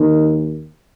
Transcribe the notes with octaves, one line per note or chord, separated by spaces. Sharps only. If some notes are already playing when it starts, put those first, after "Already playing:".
Already playing: D#2 D#3